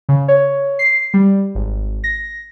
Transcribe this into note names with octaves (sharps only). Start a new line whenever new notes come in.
C#3
C#5
C7
G3
G#1
A#6